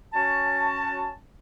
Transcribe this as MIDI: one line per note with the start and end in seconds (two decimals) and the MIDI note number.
0.14 1.10 61
0.14 1.10 66
0.14 1.10 81